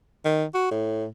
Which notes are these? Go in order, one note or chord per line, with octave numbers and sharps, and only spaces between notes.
D#3
F#4
A2